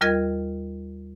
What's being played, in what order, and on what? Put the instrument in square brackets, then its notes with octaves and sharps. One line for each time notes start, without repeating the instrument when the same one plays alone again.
[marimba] D#2 G3 F4 A#4 D#5 G#6